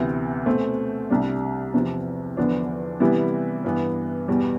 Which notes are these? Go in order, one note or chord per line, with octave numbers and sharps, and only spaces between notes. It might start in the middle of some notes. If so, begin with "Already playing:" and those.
Already playing: D2 C3 E3 B3
B2 A3 C4
C2 C3 G3 D4
E2 C3 F3
E2 D3 F3 B3 D4
C3 E3 G3 B3 E4
G2 E3 B3
E2 B2 G3